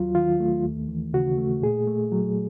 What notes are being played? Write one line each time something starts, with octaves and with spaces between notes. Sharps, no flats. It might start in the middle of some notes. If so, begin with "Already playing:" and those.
Already playing: D#2 F#3 F4
D#3 F4
A3
D#2
E3
C#3 F#4
A3
A#2 G#4
A3
F#3